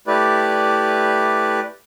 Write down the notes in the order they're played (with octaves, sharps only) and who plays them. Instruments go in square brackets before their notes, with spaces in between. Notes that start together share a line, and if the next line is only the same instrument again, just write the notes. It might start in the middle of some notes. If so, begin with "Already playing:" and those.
[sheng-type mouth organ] A3 E4 G4 B4 D5